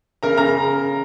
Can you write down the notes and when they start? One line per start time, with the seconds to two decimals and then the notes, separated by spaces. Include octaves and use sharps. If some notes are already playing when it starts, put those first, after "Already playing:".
0.23 C#3 A#4 A#5
0.37 C#3 A#4 A#5